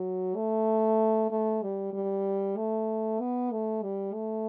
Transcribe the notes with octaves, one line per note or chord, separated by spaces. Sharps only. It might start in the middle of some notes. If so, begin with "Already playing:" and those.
Already playing: F#3
A3
A3
G3
G3
A3
B3
A3
G3
A3